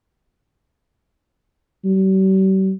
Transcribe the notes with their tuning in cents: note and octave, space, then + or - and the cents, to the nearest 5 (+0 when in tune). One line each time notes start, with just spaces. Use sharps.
G3 -45